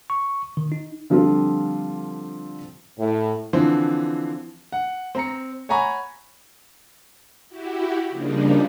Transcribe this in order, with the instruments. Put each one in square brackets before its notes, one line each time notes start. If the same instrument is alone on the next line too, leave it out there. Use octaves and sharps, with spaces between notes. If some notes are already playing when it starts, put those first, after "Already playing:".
[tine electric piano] C#6
D#3
D#4
[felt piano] D3 F3 G3 C4 F4
[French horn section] A2
[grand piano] D3 E3 F3 C4
F#5
C4 A#5 C#7
C#5 F#5 G#5 A#5 B5 C#6
[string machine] E4 F#4 G4
C#3 F3 G3 A#3 D4 D#4